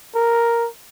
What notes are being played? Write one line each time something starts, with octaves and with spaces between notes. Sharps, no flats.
A#4